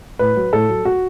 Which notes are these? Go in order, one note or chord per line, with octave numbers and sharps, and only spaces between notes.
A2 B4
F#3
A2 A4
F#3
F#4